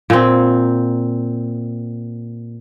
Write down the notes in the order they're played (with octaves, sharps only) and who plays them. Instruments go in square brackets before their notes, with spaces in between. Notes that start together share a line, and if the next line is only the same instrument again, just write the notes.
[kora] A#2 C4